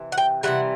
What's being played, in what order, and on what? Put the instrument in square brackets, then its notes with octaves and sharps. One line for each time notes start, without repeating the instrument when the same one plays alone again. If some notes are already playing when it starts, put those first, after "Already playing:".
Already playing: [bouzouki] C3 E3
F#5
G5
C3 E3 G3 F#5